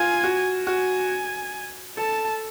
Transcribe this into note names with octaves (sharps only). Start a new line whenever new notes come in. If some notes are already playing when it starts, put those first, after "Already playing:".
Already playing: F4 G#5
F#4
F#4 G#5
A4 A5